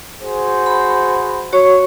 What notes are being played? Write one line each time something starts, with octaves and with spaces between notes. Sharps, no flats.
F#4 G#4 C5
B5
F#4 C#5 C#6